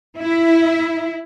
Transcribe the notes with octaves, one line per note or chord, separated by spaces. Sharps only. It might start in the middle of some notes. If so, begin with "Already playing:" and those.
E4